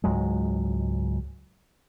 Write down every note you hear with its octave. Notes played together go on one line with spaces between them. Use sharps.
C#2 G#2 F#3 G#3